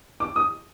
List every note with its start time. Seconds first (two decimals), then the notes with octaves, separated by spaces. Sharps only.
0.20 D6
0.36 D#6